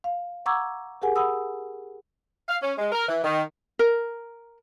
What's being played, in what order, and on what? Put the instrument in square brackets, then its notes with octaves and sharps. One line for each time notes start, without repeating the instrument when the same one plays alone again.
[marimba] F5
F#5 A#5 C#6 D6 E6 G#6
G4 G#4 A#4 F#5 G#5
F#5 B5 D#6 E6
[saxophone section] F5
C#4
G#3
A#4
E3
D#3
[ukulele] A#4